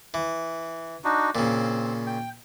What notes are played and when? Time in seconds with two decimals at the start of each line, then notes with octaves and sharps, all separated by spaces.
0.14 E3
1.04 D4 D#4 F#4
1.35 A#2 C#3 C4
2.06 G5